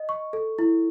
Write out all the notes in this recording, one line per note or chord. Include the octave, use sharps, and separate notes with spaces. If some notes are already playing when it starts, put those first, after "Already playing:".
Already playing: D#5
C#6
A4
E4